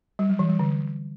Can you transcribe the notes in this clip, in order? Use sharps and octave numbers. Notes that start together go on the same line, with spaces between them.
G3
F#3
E3
G3
D3